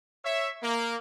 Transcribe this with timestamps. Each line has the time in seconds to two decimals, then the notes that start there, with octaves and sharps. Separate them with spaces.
0.25 C#5 E5
0.62 A#3